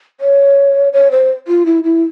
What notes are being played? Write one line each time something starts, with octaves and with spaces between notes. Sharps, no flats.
C#5
C#5
C5
F4
E4
E4